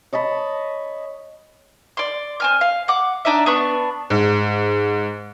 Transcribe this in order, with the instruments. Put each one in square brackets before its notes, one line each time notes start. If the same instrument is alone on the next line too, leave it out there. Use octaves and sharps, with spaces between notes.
[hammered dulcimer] C#5 D#5 A5 B5
[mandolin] D5 C6
C4 G#5 F6
F5
F#5 D6
D4 D#4 D5 E5
B3 D4 C#6
[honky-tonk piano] G#2